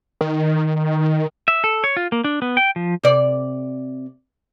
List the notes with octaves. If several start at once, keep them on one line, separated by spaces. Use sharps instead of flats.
D#3
E5
A4
C#5
F4
A#3
D4
B3
G5
F3
C3 D5